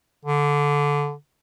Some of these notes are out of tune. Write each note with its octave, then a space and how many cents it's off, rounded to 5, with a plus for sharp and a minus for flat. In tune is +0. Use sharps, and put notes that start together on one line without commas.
D3 -15